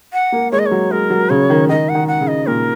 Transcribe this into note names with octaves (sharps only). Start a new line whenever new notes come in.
F#5
A#3
G#3 C#5
D#5
C#5
F#3
G#3 A#4
F#3
C#3 C#5
D#3
D#3 D#5
F#5
D#3
F#5
C#3
D#5
A#2 A#4